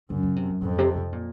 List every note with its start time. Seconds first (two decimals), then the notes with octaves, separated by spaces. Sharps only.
0.10 F#2 C#3
0.23 C#3
0.36 C3
0.49 F#2
0.62 F2 G#2
0.78 C3
0.95 C3
1.13 A#2